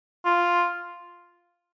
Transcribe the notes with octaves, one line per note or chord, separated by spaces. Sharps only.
F4